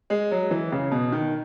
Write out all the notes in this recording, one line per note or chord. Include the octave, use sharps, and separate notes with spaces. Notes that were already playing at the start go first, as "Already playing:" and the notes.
G#3
F#3
E3
C#3
B2
D#3